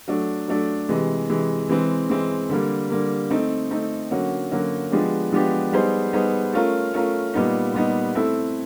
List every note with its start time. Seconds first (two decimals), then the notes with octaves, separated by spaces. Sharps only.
0.08 F#3 A3 D4
0.48 F#3 A3 D4
0.89 C3 E3 G#3
1.29 C3 E3 G#3
1.69 E3 G#3 C4
2.09 E3 G#3 C4
2.50 D3 G3 A#3
2.90 D3 G3 A#3
3.30 A3 C4 D#4
3.71 A3 C4 D#4
4.11 D3 F#3 A#3 C#4 F#4
4.51 D3 F#3 A#3 C#4 F#4
4.91 F3 G#3 B3 D4 G4
5.32 F3 G#3 B3 D4 G4
5.73 G3 B3 D#4 G#4 C5
6.13 G3 B3 D#4 G#4 C5
6.53 A3 C#4 F4 A#4
6.94 A3 C#4 F4 A#4
7.34 A#2 G3 B3 D#4
7.74 A#2 G3 B3 D#4
8.14 A3 C4 E4 A4